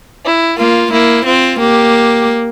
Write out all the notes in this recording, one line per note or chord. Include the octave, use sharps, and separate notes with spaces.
E4
A#3 F4
A#3 E4
C4 F4
A#3 G4